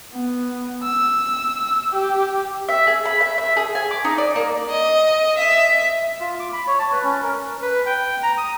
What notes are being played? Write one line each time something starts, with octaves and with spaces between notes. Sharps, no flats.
B3
E6
G4
E5
G#4
B5
E5
E5
G#4
G#5
D6
D#4
D5
A#3
D#5
E5
F4
D6
B5
C#5
A5
B4
C#4
A#4
B4
G5
A#5
D#6